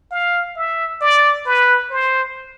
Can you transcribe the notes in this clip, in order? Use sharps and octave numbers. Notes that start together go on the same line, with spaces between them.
F5
E5
D5
B4
C5